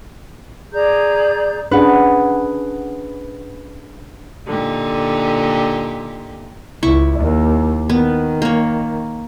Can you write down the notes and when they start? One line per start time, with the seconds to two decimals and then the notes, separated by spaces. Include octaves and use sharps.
0.73 G#4 D5 A#5 G6
1.71 C#4 D4 G#4 B4 F#5
4.48 A#2 D3 D#4 G4
6.83 C#2 E4 C#6
7.19 D#2
7.89 D#3 B3
8.42 A#3 C#5